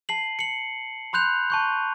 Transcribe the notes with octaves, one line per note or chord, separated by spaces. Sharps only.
A5 C7 F#7
C#7 F#7
B5 C6 F#6 G6 F7
A5 C#6 G6